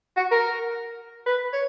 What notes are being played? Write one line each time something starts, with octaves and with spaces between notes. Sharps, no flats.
F#4
A#4
B4
C#5